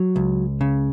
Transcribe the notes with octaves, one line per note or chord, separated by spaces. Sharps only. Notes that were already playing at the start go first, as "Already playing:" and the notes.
Already playing: F#3
C#2
C#3